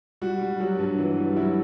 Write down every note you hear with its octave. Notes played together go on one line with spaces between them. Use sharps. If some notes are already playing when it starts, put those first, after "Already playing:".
G3 F#4
G3
F#3 F#4
G2
E3
G3
F#3 E4